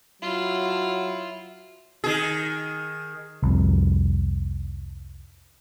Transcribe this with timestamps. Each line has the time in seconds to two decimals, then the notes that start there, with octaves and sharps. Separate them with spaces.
0.22 F#3 E4 F4
2.04 D#3 G#4
3.43 C2 F2